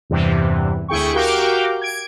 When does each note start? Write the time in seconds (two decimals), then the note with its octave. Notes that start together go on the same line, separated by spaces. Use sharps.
0.10 E2 G2 C3 E3
0.88 D2 E4 G#4 G5 C#6
1.14 F#4 G4 A#4 F5 G5 D6
1.82 G#6 D7